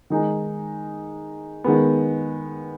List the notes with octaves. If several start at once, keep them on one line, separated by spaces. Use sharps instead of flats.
D#3 G#3 D#4 G#4
D#3 G#3 B3